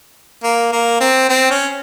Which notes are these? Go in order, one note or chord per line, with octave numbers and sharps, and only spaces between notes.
A#3
A#3
C4
C4
C#4